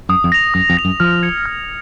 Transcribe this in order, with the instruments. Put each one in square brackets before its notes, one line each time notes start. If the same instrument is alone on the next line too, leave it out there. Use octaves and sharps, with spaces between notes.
[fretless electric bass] F#2 [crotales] D#6
[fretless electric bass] F2
[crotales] A#6 F7
[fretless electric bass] F#2 [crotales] D#6
[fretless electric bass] F2
[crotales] A#6 F7
[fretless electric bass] F#2
[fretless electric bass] F3 [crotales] F6
[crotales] G#6 C#7 F7
F6